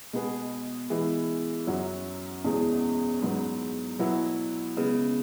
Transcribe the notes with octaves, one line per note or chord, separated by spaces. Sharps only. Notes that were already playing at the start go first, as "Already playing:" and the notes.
B2 G#3 B3 G#4
E3 G#3 B3
F#2 F#3 C#4 F#4
E2 B2 G#3 C#4 G#4
G#2 F#3 B3
B2 F#3 B3 E4
C#3 G#3 B3